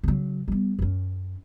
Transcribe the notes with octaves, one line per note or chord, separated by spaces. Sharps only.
C#3 F#3
G3 B3
F#2 C#4